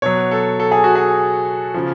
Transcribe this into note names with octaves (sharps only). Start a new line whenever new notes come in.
B2 F#3 C#5
A4
A4
G#4
F#4
G#4
C#3 F3